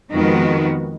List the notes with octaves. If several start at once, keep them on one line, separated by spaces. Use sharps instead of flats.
F2 D#3 G#3 B3 F#4